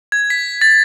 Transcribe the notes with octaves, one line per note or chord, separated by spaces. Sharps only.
G#6
B6
A6